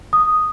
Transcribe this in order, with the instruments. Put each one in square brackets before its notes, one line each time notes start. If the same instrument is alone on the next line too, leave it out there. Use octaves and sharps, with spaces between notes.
[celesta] D#6